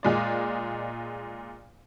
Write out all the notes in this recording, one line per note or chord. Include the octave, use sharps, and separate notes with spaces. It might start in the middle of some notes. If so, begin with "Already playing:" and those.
A#2 G#3 D5